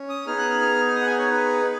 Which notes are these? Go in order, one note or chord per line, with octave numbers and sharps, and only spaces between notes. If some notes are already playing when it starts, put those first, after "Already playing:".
Already playing: C#4
D#6
B3 D#4 G#4 F6
F#6
F6
F6
D#6
F#5
G#5
C#5
B4